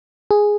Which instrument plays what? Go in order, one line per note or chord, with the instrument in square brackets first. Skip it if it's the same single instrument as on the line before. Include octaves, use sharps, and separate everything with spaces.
[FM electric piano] G#4